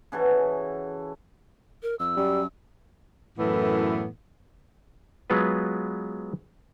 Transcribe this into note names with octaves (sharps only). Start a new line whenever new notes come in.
C#3 E3 F#4 A4
A#4
F2 E6
F#2 G3
F#2 A2 E3 B3 A4
F#3 G#3 B3 F4 B4